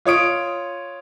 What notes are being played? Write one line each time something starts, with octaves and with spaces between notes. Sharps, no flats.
F4 C#5 D#6 D7